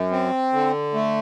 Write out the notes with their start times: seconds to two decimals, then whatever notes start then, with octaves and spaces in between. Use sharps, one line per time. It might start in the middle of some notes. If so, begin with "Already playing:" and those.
Already playing: F#2
0.11 C4
0.53 D3
0.94 A3